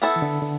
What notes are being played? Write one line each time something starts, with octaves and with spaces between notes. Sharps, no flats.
B3 E4 A4
E3
D3
D3